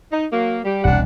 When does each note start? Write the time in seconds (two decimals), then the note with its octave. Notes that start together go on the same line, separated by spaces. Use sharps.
0.12 D#4
0.33 F#3 A#3
0.65 G3 G4
0.85 E1 C2 B2 D4 F#5